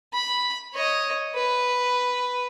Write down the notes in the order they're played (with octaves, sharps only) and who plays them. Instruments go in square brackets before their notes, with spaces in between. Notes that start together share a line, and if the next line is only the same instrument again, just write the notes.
[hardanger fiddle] B5
C#5 D#5
B4